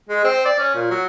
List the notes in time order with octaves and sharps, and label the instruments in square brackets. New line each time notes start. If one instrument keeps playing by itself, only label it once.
[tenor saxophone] G#3
C4
D5
C#4
A#2
F#3